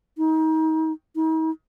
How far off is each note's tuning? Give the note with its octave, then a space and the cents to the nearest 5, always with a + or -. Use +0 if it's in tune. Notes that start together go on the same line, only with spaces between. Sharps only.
D#4 +30
D#4 +45